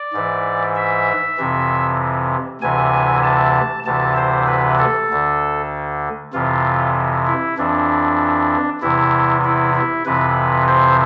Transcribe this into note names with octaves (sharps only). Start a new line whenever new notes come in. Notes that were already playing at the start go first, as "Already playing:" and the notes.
Already playing: D5
G#2 E3
E5
F2 C3 E3
D2 C3 E3 G#5
A5
D2 C3 E3 A5
C5
B4
A4
D2 D3
F2 C3 E3 F4
E4
F2 E3 D4
E2 C3 E3 E4
E4
E4
F2 C3 E3 B4
C5